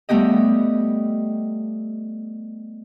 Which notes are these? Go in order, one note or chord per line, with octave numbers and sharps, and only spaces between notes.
G3 A3 B3 G4 D#5